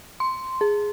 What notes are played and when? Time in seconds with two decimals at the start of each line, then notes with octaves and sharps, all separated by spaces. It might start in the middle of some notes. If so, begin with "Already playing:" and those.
0.20 C6
0.61 G#4